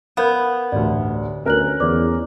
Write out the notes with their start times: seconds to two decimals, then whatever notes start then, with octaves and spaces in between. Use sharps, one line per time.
0.17 B3 A#4 C5 F5 G6
0.72 A1 D2 D5
1.45 D2 C#4 A#4 B4 F#6 F#7
1.80 E2 C5 D5 D6